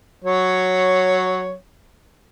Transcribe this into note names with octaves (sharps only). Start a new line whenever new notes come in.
F#3 C#5